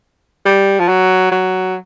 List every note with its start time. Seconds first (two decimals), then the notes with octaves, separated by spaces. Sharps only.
0.46 G3
0.80 F3
0.88 F#3
1.31 F#3